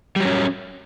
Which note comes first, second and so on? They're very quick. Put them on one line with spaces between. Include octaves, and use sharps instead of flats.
G3 F#3 C#4